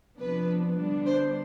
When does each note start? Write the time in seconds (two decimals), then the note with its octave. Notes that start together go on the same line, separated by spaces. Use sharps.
0.18 C3 F3 B3 D4 B4
0.78 D3 G3 B3 D4
1.06 C5